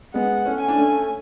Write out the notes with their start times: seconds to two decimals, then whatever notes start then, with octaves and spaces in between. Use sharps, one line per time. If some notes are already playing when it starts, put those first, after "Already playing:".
0.14 G#3 B3 F#5
0.46 A3 C#4
0.61 G#5
0.68 D4
0.77 A3 C#4